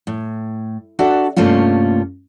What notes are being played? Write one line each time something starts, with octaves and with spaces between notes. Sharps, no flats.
A2
D4 F#4 A4 D5 E5
G2 C3 A3 A#3 C#4 F4